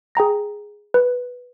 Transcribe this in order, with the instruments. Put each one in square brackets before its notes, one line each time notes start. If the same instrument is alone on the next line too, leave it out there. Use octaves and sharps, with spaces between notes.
[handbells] G#4 G5 A#5 A#6
B4